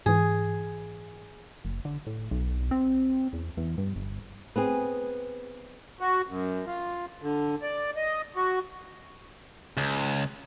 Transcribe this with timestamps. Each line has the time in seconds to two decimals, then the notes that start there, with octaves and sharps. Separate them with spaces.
0.06 G#2 E3 G#4
1.65 F#1
1.85 D3
2.07 A2
2.31 B1
2.71 C4
3.33 E2
3.57 E2
3.78 G2
3.96 G1
4.56 B3 C4 G#4
6.01 F#4
6.27 F#2
6.67 F4
7.22 D3
7.62 D5
7.96 D#5
8.36 F#4
9.77 C#2